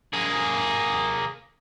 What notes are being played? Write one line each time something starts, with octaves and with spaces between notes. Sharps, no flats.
A#3 G#4